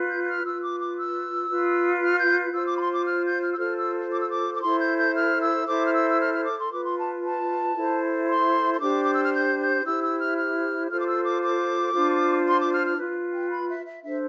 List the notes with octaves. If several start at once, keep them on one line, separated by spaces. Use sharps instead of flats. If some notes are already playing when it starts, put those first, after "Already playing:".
Already playing: F4 B4
G6
G6
F6
F4 B4 E6
D6
D6
E6
F4 B4
F6
G6
F4 C5 E6
D6
B5
C6
D6
F6
G6
F6
E6
F4 A4 C5 F6
E6
D6
E6
D6
D6
E4 A4 C5 C6
G6
G6
F6
E6
E4 A4 C5 D6
F6
E6
E6
F6
F6
D6
C6
F4 B4 D6
C6
A5
A5
E4 A4 C5
C6
C6
D4 G4 C5 D6
D6
E6
F6
G6
G6
E4 G4 C5 E6
E6
F6
F6
F4 A4 C5 F6
D6
E6
D6
D6
D4 F4 C5
C6
D6
F6
F6
F4 B4
G5
B5
E5
E5
D4 A4 C5 E5